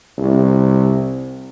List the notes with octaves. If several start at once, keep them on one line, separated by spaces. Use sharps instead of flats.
C2